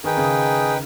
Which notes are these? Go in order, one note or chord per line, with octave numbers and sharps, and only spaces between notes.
D#3 D#4 G#4 B4 G5
C#3